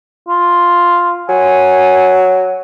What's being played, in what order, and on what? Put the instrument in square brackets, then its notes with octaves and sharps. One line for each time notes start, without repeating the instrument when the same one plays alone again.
[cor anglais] F4
[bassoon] F#3 [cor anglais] G#5